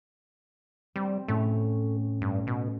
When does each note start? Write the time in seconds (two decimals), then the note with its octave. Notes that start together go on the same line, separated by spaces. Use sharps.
0.96 G3 C4
1.28 A2 A3 C#4
2.22 G2
2.47 B2